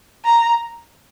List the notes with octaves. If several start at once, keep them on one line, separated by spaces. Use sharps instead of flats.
A#5